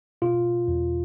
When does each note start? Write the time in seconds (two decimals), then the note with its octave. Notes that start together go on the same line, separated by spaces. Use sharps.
0.22 B2 F4
0.68 E2